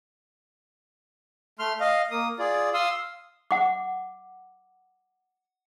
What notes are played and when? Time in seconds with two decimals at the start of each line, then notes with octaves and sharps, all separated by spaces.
1.59 A3 C6 F6
1.80 D#5 F5
2.11 A#3 D#6
2.39 F4 G#4 D5
2.74 F5 C6 D#6 E6
3.51 F#5 D6